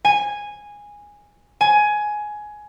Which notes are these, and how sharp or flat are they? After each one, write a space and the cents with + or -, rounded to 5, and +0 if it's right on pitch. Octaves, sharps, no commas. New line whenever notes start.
G#5 -10
G#5 +15